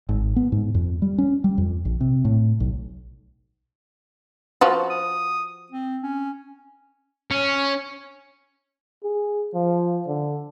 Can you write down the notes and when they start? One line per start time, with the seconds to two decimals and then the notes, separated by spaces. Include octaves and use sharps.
0.09 G#1
0.36 B3
0.52 G#2
0.74 F2
1.02 G3
1.18 C#4
1.44 G3
1.58 F2
1.85 A#1
2.01 C3
2.25 A2
2.60 B1
4.61 F3 F4 F#4
4.90 D#6
5.72 C4
6.03 C#4
7.31 C#4
9.03 G#4
9.54 F3
10.07 D3